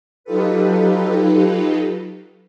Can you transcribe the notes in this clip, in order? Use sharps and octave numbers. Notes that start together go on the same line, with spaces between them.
F#3 D#4 F4 G4 A4 B4